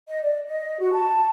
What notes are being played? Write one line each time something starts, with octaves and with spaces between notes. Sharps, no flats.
D#5
D5
D#5
F#4
A5